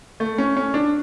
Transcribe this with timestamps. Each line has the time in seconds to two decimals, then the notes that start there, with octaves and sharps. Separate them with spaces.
0.20 A3
0.38 C#4
0.56 C#4
0.74 D4